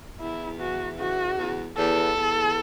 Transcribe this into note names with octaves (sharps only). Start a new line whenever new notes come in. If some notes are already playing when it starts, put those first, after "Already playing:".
E2 E4
E3 F#4
C#3 F#4
E2
E2 A4
E2